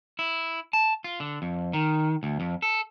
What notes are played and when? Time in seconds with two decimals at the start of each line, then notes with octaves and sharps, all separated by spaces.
0.19 E4
0.73 A5
1.04 F4
1.20 D3
1.42 F2
1.73 D#3
2.23 D2
2.40 F2
2.62 A4